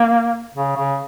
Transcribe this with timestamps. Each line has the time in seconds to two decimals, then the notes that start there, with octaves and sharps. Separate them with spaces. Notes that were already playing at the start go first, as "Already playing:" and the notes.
Already playing: A#3
0.54 C#3
0.76 C#3